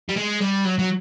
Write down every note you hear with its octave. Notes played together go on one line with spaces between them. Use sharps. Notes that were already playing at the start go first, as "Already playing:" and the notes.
G3
G#3
G3
F#3
F#3